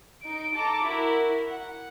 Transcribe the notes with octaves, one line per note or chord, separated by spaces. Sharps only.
D#4 D7
A4 A5 A#5 D6
E4 F#4 A#4
F#5